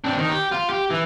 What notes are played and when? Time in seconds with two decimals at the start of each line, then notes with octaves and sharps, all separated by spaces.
0.04 C4 D4
0.18 D#3
0.30 G4
0.52 F4
0.70 G4
0.90 E3